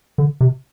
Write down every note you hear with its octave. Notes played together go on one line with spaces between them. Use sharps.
D3
C3